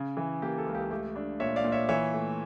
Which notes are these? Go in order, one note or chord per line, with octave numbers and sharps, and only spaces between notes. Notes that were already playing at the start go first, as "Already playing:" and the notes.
Already playing: C#3
E3
A#3 G4
A4
C#2
G4
A3 G4
D4
A#2 C#5 E5
D5 F5
A#2
C#5 E5
E3 C#5 E5
A3